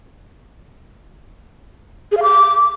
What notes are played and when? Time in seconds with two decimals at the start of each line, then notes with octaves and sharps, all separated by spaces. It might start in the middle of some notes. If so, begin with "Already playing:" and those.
2.12 G#4
2.17 F5
2.23 D6